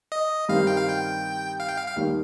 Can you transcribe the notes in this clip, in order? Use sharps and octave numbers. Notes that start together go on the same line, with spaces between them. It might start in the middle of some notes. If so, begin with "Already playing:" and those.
D#5
G2 D#3 G3 C4 D#4 F5
G5
F5
G5
F5
G5
F5
F5
D#2 D#3 G3